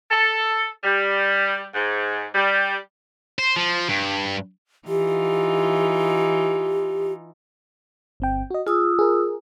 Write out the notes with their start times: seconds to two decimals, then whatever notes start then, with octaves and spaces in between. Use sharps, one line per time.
0.09 A4
0.84 G3
1.73 G#2
2.34 G3
3.39 C5
3.56 F3
3.89 G2
4.88 E3 D#4 F4 G4
8.20 G1 C4 G5
8.51 F#4 D#5
8.67 F4 G#4 D#6 E6
8.99 G#4 A#4